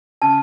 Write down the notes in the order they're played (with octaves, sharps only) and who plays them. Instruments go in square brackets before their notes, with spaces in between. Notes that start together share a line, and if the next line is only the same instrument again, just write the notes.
[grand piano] C#3 [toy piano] A5